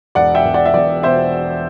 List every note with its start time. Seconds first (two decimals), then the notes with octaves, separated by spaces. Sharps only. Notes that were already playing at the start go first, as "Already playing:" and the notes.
0.15 E1 D5 F#5
0.35 E5 G5
0.44 E1
0.54 D5 F#5
0.65 E5
0.74 E2 D5
1.03 B2 C5 E5